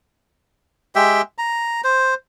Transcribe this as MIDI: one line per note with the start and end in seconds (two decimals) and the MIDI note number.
0.95 1.21 56
0.95 1.21 67
0.95 1.21 76
0.95 1.21 79
1.38 1.81 82
1.84 2.14 72